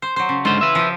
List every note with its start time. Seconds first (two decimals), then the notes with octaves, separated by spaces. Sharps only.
0.02 C5
0.16 F#3 C5
0.29 C#3
0.45 G#2 D3 F4 C5
0.61 B4 E5
0.75 F3 G4